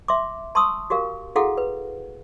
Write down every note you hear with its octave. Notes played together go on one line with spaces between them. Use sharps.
E5 C6 D6
A5 C6 C#6 D#6 E6
F#4 G4 A#4 F5
E4 F#4 G#4 A4 F5 F#5
B4